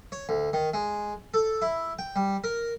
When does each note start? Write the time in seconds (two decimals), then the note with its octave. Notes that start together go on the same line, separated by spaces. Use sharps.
0.12 C#5
0.29 D2
0.53 D#3
0.74 G#3
1.34 A4
1.62 E4
1.99 G5
2.16 G3
2.44 A#4